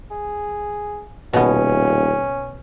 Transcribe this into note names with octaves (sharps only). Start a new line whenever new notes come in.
G#4
D#1 B2 B3 C#4